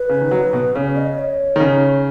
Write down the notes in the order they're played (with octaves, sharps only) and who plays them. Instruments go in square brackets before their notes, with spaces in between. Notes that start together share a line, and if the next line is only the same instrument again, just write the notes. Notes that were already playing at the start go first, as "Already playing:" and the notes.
Already playing: [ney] B4
[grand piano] C#3
D#3
F#3
B2
[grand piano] C#3 [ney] C#5
[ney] D#5
C#5
[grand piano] D#3
C#3